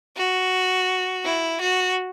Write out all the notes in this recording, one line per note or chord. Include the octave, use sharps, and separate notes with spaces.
F#4
E4
F#4